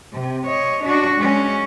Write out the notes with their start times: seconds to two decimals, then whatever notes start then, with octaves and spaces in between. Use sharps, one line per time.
0.14 C3
0.47 C#5 D#5
0.84 D4 F#4
1.16 G#3 C#4